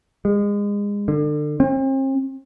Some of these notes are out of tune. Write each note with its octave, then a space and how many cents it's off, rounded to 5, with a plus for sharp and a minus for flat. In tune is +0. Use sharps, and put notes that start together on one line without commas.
G#3 -30
D3 +30
C4 +40